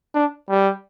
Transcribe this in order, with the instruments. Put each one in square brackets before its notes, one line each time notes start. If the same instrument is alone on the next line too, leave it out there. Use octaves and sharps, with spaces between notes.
[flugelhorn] D4
G3